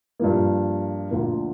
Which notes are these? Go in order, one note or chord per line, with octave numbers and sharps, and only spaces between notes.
G2 F3 A#3
D2 D3 F3 A#3